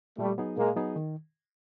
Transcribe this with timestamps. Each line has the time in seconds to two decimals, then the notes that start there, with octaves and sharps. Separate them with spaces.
0.18 A#2 G3 A3
0.38 F#3 B3 D#4 G#4
0.56 A#2 G#3 A#3
0.76 F#3 B3 D#4 G#4
0.96 D#3